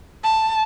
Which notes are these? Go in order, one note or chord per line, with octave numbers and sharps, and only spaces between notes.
A5